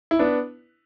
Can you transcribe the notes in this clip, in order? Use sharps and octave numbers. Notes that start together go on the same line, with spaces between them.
E4
B3 D4